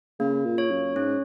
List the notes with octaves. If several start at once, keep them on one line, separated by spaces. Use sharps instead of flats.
C#3 A#3
A#2
C#5
F#2
G#2 C#4